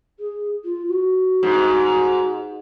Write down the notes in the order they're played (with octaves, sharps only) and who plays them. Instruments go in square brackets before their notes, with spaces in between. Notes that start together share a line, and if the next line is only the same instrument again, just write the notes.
[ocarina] G#4
F4
F#4
[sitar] G#2